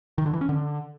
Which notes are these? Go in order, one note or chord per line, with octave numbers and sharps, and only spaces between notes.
D#3
D3
E3
C#4
D3